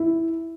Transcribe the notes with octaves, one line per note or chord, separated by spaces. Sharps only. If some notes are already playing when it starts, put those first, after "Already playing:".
Already playing: E4